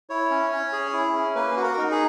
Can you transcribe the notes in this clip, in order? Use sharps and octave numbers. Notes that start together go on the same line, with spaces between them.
E4 C#5
C#4
C#4
G#4
E4
C#4
A#3 B4
F#4
A#4
D#4
G#4